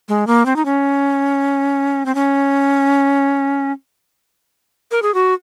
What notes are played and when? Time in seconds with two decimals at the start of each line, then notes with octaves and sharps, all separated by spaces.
0.09 G#3
0.27 A#3
0.46 C4
0.56 D#4
0.65 C#4
2.06 C4
2.15 C#4
4.91 A#4
5.02 G#4
5.14 F#4